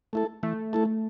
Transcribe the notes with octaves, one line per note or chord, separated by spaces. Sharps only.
A3 E4 A4
E3 A3
A3 E4 A4